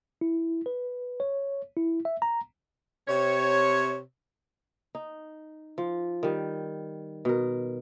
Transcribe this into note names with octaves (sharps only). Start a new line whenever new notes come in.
E4
B4
C#5
E4
E5
A#5
C3 C#5
D#4
F3
D#3 G3
B2 A#4